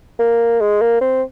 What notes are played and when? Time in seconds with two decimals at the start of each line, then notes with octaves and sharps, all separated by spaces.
0.19 A#3
0.61 G#3
0.81 A#3
1.01 C4